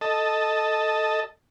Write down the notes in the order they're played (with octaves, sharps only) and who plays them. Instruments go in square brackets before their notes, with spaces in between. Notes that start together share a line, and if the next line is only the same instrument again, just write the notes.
[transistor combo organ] A4 D#5 A5